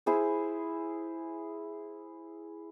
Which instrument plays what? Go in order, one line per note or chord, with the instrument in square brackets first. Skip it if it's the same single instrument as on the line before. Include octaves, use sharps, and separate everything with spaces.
[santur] E4 G#4 C5